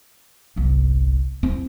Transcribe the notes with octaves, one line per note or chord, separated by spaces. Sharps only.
G1 C2
C4 E4